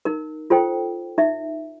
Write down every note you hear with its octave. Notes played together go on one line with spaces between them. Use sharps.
D#4 A#4
F4 A4 C5 G5
D#4 E5